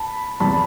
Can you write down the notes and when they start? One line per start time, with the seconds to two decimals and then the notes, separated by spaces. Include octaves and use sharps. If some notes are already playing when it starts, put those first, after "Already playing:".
Already playing: A5 B5
0.40 E2 C3 F3 A5 B5